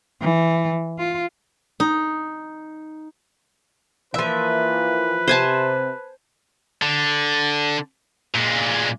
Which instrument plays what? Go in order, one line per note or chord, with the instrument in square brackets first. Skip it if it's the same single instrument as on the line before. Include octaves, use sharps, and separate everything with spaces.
[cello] E3
F4
[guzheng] D#4
[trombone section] E3 A#3 [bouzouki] F3 E5 [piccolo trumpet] B4
[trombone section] C3 [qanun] C5 G#5 A5
[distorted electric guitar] D3
A#2 G#3